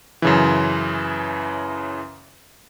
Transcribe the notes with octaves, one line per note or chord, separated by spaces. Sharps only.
F#2 C#3 E3